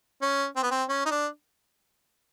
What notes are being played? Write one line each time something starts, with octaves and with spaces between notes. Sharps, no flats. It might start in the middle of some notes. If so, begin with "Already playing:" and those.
C#4
C4
B3
C4
C#4
D#4
D4